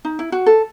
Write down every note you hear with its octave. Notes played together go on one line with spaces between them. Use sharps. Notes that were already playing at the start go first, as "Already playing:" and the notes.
D#4
E4
F#4
A4